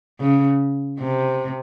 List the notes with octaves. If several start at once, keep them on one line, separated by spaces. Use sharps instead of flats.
C#3
C3